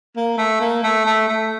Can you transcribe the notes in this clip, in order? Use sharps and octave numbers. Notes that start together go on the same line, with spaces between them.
A#3
A3
A#3
A3
A3
A3